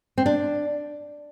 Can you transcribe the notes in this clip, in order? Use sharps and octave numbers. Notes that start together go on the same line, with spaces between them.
C4
D4